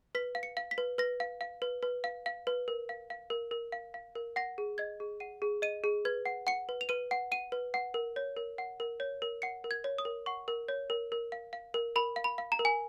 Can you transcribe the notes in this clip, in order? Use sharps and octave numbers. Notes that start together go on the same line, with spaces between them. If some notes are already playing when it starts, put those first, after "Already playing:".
B4 B6
F5
C#7
F5
B6
B4
B4 A#6
F5
F5
B4
B4
F5
F5
B4
A#4
F5
F5
A#4
A#4
F5
F5
A#4
F#5 A#6
G#4
D#5 G#6
G#4
F#5 D#7
G#4
D#5 D#7
G#4
B4 G#6
F#5
F#5 C#7
B4
F7
B4 D#7
F#5
F#5 D#7
B4
F#5
A#4
C#5
A#4
F#5
A#4
C#5
A#4
F#5 C#7
A#4
G#6
C#5
D#6
A#4
F#5 C#6
A#4
C#5
A#4
A#4
F5
F5
A#4
A#4 B5
F5
B5
F5
A#5
A#4
G#5